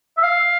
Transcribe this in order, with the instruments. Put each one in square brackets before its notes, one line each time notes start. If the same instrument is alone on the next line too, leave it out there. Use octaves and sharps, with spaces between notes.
[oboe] E5
F5